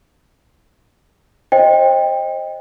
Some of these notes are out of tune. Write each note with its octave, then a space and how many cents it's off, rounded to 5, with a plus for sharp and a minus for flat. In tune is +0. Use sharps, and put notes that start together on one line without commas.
C5 +20 D#5 +0 G5 +20